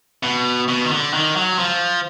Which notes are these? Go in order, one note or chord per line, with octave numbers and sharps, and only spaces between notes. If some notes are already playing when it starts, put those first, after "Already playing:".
B2
B2
D#3
D3
D#3
F#3
F3